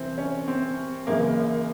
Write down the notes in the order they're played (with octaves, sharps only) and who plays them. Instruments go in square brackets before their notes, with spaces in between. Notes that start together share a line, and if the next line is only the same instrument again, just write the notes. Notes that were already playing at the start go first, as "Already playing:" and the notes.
Already playing: [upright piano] C2 C3 E3 C4
C#4
C4
G#1 F#2 C#3 E3 A#3